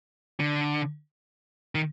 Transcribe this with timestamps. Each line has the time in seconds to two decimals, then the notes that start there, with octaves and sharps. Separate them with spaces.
0.40 D3
1.75 D#3